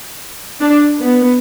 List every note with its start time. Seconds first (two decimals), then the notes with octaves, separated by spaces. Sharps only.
0.60 D4
1.00 B3